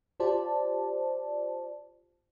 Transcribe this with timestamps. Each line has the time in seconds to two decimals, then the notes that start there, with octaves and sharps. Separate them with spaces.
0.20 F4 G4 C5 D5 A5